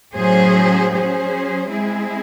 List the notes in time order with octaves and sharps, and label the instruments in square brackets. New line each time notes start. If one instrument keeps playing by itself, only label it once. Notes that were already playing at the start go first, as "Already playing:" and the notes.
[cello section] A2 F#3 C#4 G#4 C5
F#3 C#4 G#4 C5
G#3 C4 E4 G#4